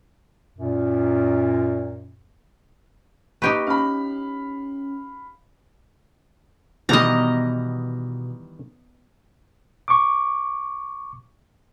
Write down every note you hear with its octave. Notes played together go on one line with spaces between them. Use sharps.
F#2 A#2
A#3 D#4 G4 B4 C#6 A#6
C#4 F5 B5
B2 D#3 E3 G3 D#5 A#5
C#6 D6